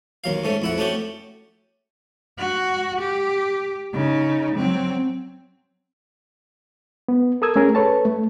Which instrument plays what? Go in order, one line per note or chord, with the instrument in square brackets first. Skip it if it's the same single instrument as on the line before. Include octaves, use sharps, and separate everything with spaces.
[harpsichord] D#2 F#3 F5
G#2 A3 C#4
F2 E4 F#5
A3 C#4 F#4 G4
[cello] F#4
G4
C#3 D#4
F#3 C4
[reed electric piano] B3
A4 A#4 D#6 E6 G#6
A3 C#4 G#4 A#4
A4 B4 C#5 A5
A3